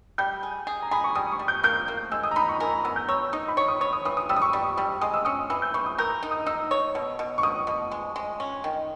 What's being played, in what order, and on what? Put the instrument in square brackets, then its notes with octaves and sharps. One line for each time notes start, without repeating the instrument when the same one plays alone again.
[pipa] G3 [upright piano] G6
[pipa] G#4
G#4
[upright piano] A#5
[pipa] G#4 [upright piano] B5
[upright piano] C#6
[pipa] G3 [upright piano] D#6
[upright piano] C#6
[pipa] G3
[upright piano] G6
[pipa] A#3 [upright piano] G6
[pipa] A#3
[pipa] G#3 [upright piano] E6
[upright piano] D#6
A#5
[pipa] D#4 [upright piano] B5
[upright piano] C#6
[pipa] A#4 [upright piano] G#5
[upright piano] A#5
[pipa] B3 [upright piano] E6
[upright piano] G6
[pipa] C#5 [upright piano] E6
[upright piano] E6
[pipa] D#4 [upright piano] D#6
[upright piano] B5
[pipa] C#5 [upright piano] C#6
[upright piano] D#6
[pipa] C#5 [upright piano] D#6
[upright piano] D#6
[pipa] E3 [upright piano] D#6
[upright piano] D#6
[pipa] G3 [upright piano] E6
[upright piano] D#6
C#6
[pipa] G3
G3
[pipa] G#3 [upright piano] D#6
[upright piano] E6
[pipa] C#4 [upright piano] D#6
[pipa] E3 [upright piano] E6
[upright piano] G6
[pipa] E3 [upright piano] C#6
[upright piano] D#6
[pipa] A#4 [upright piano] G6
[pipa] D#4
[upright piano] D#6
[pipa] D#4 [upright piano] E6
[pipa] C#5
B2
B2
[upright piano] C#6
[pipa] B2 [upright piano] D#6
[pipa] B2
G#3
G#3
C#4
D#3